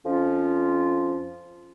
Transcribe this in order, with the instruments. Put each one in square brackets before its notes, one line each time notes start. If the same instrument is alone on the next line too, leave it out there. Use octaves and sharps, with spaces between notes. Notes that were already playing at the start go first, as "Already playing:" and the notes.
[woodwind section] F2 F3 C#4 F4